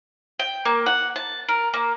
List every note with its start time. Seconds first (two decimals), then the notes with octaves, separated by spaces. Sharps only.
0.39 G5
0.65 A#3
0.86 F#5
1.16 A5
1.49 A#4
1.74 A#3